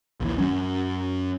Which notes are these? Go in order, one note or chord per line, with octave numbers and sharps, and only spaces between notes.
A#1 D#2 E3
F#2 F#3 C#4